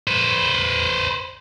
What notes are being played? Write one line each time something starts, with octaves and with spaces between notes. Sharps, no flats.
B4 C5